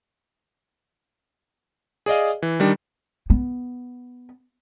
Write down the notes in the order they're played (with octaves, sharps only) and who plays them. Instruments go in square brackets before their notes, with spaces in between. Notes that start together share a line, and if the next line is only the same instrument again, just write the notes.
[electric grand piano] G#4 D5 D#5 F5
E3
D#3 G3 D4
[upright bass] B3